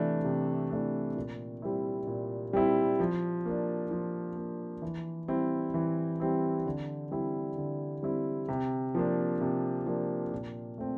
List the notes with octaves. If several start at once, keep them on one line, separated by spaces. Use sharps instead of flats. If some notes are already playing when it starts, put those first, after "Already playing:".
Already playing: C3 E3 A3 D4
C3
E3 A3 D4
A#2
G3 C4 E4
A#2
G3 C4 E4
F3
A#3 D4
F3
A#3 D4
E3
G3 C4 E4
E3
G3 C4 E4
D3
G3 C4 E4
D3
G3 C4 E4
C3
F3 A#3 D4
C3
F3 A#3 D4
A#2
A3 C4